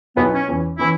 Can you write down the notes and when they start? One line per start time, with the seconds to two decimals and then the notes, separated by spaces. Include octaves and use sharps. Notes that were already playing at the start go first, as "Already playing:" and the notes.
0.16 B1 B2 F#3 B3 E4 B4
0.33 C#4
0.48 E2 E3 C#4
0.79 E3 C#4 E4